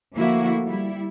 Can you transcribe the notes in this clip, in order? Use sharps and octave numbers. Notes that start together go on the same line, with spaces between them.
D3 F3 A3 A#3 E4 F#4
G3 E4